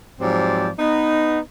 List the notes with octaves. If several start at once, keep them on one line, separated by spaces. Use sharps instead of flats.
G#2 F3 F#3 C4 G4 D5
B3 D#4